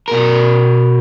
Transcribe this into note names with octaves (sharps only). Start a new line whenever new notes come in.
B2 A#4